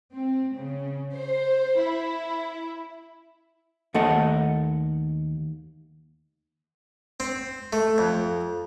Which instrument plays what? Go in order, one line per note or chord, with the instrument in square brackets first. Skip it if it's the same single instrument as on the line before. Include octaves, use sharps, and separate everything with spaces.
[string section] C4
C#3
C5
E4
[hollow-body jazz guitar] D#2 A3 A4 D#5 F#5
[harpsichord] C4
A3
F2